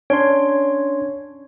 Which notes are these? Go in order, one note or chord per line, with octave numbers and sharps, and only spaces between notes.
C#4 D4 C#5 C6